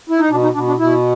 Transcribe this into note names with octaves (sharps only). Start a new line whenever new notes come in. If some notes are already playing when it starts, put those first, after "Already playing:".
E4
D#4
B2 D4
D#4
B2 D4
D4
B2 E4